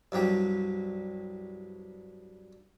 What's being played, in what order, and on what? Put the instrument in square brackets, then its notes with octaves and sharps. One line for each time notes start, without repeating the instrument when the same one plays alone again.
[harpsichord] C2 G2 F#3 G4